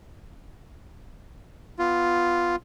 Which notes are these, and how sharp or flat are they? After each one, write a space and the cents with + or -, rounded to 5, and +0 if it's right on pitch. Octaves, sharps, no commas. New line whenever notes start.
B3 +5 F4 +0